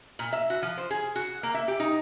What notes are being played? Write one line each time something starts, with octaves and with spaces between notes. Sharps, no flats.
A#2
E5
F#4
F3
C5
G#4
F#4
A#3
E5
G4
D#4